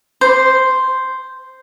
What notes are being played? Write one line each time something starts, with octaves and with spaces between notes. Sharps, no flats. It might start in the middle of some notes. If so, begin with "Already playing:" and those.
C5